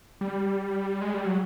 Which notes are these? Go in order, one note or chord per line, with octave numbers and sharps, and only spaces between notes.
G3
G#3
G3
F#3